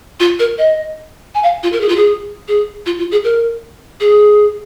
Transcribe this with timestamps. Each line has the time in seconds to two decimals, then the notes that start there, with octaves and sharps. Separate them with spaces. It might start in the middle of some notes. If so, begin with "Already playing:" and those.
0.20 F4
0.39 A#4
0.58 D#5
1.35 G#5
1.43 F5
1.63 F4
1.73 A#4
1.81 G#4
1.89 F4
1.96 G#4
2.48 G#4
2.86 F4
2.98 F4
3.12 G#4
3.24 A#4
4.00 G#4